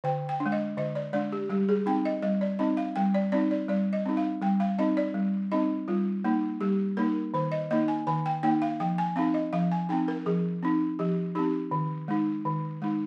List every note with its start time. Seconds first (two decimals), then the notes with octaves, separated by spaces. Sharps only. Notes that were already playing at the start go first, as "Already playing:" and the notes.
0.04 D3 G5
0.29 G5
0.40 D4
0.46 G#3
0.52 D#5
0.77 D3 D#5
0.95 D5
1.13 G#3 D4 D5
1.32 G4
1.49 G3 G4
1.69 G#4
1.86 C4 D#4 G5
2.05 D#5
2.22 G3 D#5
2.41 D5
2.59 C4 D#4 D#5
2.77 F5
2.96 G3 G5
3.15 D5
3.32 C4 D#4 D5
3.51 D5
3.68 G3 D5
3.93 D#5
4.06 C4 D#4
4.17 F5
4.42 G3 G5
4.60 F5
4.78 C4 D#4 D#5
4.97 D5
5.14 G3
5.52 C4 D#4 D#5
5.88 G3 F4
6.24 A#3 D#4
6.61 G3 G4
6.97 A#3 D#4 A#4
7.34 D#3 C5
7.52 D#5
7.71 A#3 D#4 D#5
7.88 G#5
8.07 D#3 G#5
8.26 G5
8.43 A#3 D#4 G5
8.62 F5
8.80 F3 G5
8.98 G#5
9.16 C4 D#4 F5
9.34 D#5
9.53 F3 F5
9.72 G#5
9.89 C4 D#4 G5
10.08 A#4
10.26 F3 G#4
10.63 C4 D#4
10.99 F3 G4
11.35 C4 D#4 G4
11.71 D#3
12.08 G#3 D#4
12.45 D#3
12.82 G#3 D#4